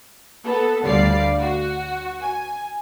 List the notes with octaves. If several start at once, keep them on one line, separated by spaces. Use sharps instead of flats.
B3 A4
D2 D3 G3 D5 F5 C7
F#4
G#5